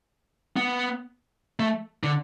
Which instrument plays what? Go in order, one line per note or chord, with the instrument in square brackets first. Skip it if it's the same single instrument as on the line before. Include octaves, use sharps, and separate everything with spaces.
[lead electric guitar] B3
A3
D3